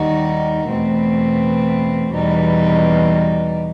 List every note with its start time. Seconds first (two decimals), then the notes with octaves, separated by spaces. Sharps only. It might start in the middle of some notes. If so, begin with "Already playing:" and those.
Already playing: D#2 D#3 G3 D#4 F#4
0.68 E2 B2 A3 C4
2.12 E2 B2 G3 D#4